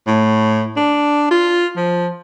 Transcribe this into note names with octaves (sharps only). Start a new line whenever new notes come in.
A2
D4
F4
F3